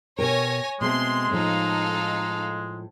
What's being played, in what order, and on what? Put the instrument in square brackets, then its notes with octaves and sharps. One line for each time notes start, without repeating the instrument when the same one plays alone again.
[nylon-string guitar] B2 G4 A#4 [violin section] C#5 G#5 A#6
[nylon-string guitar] B2 A3 C4 [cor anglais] G#3 [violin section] C6
[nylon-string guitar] A2 F3 [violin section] D#4 A4 F5